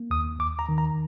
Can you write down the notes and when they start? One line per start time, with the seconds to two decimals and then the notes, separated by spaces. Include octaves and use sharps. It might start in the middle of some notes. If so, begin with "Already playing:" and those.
Already playing: A#3
0.10 D#2 D#6
0.39 D#2 D6
0.59 A#5
0.69 D#3
0.78 A#5